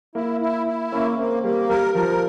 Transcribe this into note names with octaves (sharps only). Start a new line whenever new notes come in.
A#3 E4
E4
E4
A#3 C#4
A#3 C4
G3 A#3
G3 A#4
F3 A#4